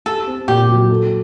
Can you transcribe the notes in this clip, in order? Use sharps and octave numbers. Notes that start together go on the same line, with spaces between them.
G4 A4
C4
A#2 G4
F#3
A4